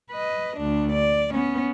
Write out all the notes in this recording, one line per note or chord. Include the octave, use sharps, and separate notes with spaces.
B4 D#5
D2 D4
D5
B3 C#4